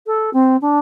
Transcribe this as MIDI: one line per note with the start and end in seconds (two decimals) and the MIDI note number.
0.07 0.30 69
0.33 0.57 60
0.61 0.79 62